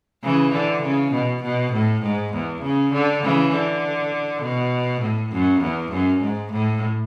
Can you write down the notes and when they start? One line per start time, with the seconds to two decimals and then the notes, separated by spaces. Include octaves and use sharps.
0.23 C#3 E3
0.53 D3
0.83 C#3
1.12 B2
1.43 B2
1.72 A2
2.02 G#2
2.33 E2
2.62 C#3
2.93 D3
3.23 C#3 E3
3.52 D3
4.42 B2
5.01 A2
5.32 F#2
5.61 E2
5.92 F#2
6.21 G#2
6.52 A2